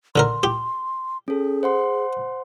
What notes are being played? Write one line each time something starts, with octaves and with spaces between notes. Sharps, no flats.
D3 A4 A#4 C6
G4
C#4 G#4 A4
C5 F#5 C6